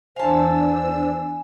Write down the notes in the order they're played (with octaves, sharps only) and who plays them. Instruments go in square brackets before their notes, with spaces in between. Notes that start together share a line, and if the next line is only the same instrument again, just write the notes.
[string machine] E2 D4 E6 [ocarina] C5 [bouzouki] F5 A5 [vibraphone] G#5